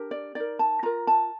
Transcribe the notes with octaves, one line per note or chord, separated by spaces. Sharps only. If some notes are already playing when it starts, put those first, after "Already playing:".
Already playing: D4 G4 A#4
D5
D#4 A#4 D5
A5
F4 A#4 A#5
A5